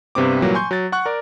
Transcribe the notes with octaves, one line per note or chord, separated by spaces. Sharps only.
G2 C3 B3 C4 D6
A#2 E3 F#3 G3 A#3
G#5 C6 C#6 G6
F#3 A6
F#5 C#6 F#6
A#4 D5